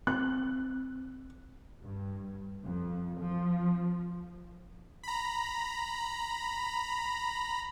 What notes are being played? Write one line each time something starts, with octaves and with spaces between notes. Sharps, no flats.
C4 F#6
G2
F2
F3
A#5 B5